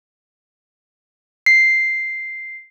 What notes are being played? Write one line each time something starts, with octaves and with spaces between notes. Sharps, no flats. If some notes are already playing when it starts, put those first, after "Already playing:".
C7